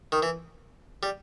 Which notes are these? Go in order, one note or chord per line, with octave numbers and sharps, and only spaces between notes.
D#3
E3
G3